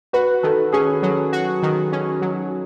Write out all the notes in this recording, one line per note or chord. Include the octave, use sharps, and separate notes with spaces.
F#4 B4
D#3 A4
C#4 G#4
F#3
F#4
D#3
C#4
F#3